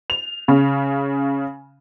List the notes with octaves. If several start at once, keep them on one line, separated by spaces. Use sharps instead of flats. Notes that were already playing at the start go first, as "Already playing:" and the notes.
F7
C#3